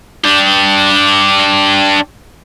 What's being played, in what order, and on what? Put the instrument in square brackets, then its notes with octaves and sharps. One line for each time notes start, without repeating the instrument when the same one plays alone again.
[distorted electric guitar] D4 G4